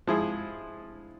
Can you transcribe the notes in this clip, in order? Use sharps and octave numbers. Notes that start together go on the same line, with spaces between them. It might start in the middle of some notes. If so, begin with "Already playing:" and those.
F3 G#3 E4 G#4